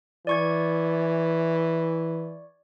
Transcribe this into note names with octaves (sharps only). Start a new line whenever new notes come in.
E3 D5 C#6 G#6